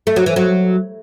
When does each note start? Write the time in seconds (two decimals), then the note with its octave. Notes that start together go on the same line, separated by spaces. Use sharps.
0.07 A3
0.16 F#3
0.26 E3
0.36 F#3